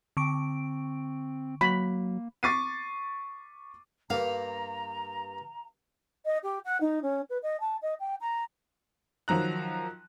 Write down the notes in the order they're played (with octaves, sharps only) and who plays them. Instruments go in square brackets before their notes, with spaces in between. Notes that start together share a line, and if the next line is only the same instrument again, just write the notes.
[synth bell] D3 C#6 D7 [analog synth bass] C4
[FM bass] F#3 [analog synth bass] A#3 [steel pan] B5
[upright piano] C#6 D6 A6 B6 C7 D#7
[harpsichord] G2 A#3 [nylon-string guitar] F5 [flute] A#5
[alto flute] D#5
G4
F#5
D#4
C#4
B4
D#5
A5
D#5
G5
A#5
[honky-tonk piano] D#3 F3 F#3 A#5 F#6